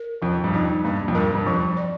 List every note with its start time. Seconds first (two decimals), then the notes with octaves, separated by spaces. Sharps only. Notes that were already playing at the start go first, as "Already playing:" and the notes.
Already playing: A#4
0.22 F2 F3
0.44 G2
0.54 F2 D#4
0.85 G2 A#3
1.08 F2
1.15 G2 A#4
1.35 G2
1.46 F2 F3
1.77 D5